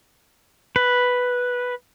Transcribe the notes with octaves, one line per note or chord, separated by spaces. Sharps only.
B4